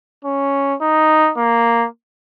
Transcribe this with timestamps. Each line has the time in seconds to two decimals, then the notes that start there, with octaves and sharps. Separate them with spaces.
0.25 C#4
0.82 D#4
1.37 A#3